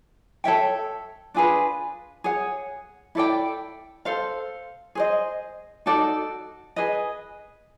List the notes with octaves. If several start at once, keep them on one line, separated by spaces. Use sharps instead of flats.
A4 C#5 E5 G5
D4 F4 G#4 B4
G#4 C#5 F#5
E4 A4 D5 G5
A4 C5 F5
G#4 C5 D#5
D#4 F#4 A4 D5
G#4 B4 D#5